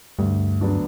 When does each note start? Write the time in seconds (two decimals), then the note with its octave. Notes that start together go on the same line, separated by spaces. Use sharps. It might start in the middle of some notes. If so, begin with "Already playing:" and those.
0.18 D2 G2
0.61 D3 F#3 B3 D4